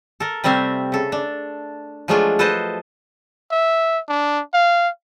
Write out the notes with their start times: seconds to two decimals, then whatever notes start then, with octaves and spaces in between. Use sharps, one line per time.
0.20 A4 A#4
0.44 C3 G3 A3 C4 E5 F5
0.92 C#3 A4
1.12 D4
2.08 F3 F#3 G#3 A3 D4 F4
2.39 A4 B4 C5 D#5 A5
3.51 E5
4.09 D4
4.54 F5